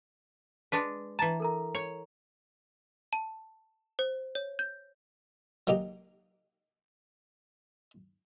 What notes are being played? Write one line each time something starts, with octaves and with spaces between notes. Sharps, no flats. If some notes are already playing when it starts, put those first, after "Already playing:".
G#3 D4 B4
E3 A5 A#5
A4 A#4 A#5
C#5
A5
C5
C#5
G6
F#3 A#3 D#4 G4